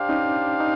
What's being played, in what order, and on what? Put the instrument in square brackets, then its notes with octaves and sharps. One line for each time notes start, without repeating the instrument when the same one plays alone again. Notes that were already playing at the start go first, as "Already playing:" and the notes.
Already playing: [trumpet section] D4 G4 C5 F5
[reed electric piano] C#4 D#4
D#4